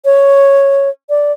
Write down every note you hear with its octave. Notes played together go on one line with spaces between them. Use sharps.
C#5
D5